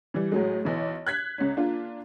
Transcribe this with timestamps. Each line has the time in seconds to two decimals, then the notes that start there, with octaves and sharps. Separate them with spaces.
0.14 E3 G3
0.32 A2 F#3 G#3
0.65 B1 E3
1.07 F#6 G#6 B6
1.38 C#2 C#4
1.56 A#3 D4 F4